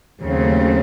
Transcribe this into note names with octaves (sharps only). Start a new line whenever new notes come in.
D#2 C#3 F#3 A3 C4